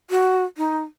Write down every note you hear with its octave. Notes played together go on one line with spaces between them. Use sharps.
F#4
D#4